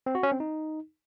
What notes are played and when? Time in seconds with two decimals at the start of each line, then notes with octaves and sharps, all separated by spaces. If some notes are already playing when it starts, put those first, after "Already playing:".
0.06 C4
0.15 F#4
0.23 C#4
0.32 C4
0.40 D#4